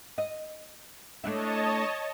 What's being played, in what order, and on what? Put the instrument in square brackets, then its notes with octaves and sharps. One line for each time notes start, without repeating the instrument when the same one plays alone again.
[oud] D#5
[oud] A3 D4 E4 [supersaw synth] C#5 D#5 A5